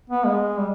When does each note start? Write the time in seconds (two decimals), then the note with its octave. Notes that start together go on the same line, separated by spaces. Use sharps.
0.10 B3
0.24 G#3
0.58 G3